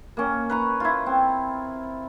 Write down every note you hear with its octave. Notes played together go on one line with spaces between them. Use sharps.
A#3 C#4
B4 A#5 C#6
E4 F4
C4